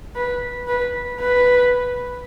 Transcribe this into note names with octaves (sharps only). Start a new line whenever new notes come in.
B4
B4
B4